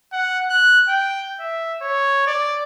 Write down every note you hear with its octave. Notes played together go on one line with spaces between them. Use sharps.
F#5
F#6
G5
E5
C#5
D5